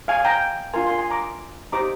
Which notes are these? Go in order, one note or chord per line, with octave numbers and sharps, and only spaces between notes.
F5 G#5
G5 A#5
D4 F4 A#4 G#5 C6
G#5 C6
G#5 C6
A#5 D6
D#4 G4 C5 A#5 D6